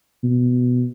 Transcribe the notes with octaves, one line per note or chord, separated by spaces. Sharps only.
B2